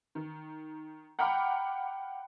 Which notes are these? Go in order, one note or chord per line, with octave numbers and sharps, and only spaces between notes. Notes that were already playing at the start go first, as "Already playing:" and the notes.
D#3
F#5 G5 A#5 B5 D6 F6